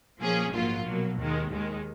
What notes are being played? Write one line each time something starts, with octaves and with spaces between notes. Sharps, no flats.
A#2 F3 A#3 C#4 G#4
A#1 G#2 F#3 A#3 F4
B2 F#3 A#3
D#2 D#3 G#3
D#2 D#3 G#3